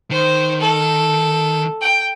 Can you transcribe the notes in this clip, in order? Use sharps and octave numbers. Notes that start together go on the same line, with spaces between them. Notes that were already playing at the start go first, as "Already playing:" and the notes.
D#3 C5
A4
G5